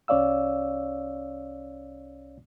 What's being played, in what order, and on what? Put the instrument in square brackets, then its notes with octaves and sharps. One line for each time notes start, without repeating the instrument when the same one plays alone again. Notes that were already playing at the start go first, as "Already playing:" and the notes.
[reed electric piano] C2 C#4 C#5 D5 F5 E6